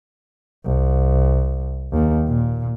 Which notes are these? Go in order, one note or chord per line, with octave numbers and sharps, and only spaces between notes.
C2
D#2
A#2